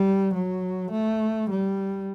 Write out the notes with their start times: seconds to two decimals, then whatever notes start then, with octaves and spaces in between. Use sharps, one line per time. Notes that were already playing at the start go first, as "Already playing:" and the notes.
Already playing: G3
0.34 F#3
0.91 A3
1.50 G3